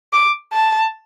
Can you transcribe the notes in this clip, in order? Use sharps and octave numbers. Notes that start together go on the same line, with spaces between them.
D6
A5